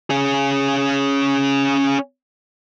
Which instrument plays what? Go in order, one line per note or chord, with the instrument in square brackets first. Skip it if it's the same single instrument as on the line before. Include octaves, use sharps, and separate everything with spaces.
[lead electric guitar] C#4 G#4